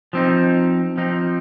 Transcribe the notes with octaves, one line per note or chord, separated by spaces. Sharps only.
F3 C4 D#4
F3 C4 D#4